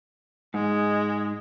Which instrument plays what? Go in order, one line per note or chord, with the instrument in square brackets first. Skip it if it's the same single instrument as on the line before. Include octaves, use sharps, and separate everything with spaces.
[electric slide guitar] G#2 [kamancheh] G#3